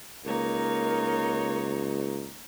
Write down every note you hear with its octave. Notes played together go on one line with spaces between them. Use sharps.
C#2 A#3 D#4 A#4 C#5